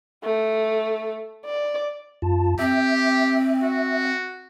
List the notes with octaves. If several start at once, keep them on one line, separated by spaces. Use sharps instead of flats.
A3
D5
F#2 F4 A5
C4 G4 E5
F#4